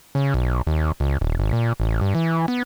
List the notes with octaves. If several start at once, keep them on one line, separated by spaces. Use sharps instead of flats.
C#3
B1
D#2
C#2
D#1
G#1
A#2
A1
G2
E3
B3